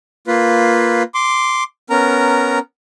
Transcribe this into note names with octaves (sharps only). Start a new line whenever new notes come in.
A#3 F4 B4
C6 D6
B3 C#4 A#4 A#5